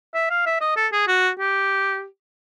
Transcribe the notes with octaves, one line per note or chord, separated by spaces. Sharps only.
E5
F5
E5
D#5
A4
G#4
F#4
G4